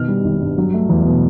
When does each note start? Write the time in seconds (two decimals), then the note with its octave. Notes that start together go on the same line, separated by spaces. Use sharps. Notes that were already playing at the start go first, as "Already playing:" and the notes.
Already playing: B2 D#3 F6
0.08 G3
0.24 G#1
0.41 G2
0.58 F#3
0.74 A3
0.89 E2
1.06 B2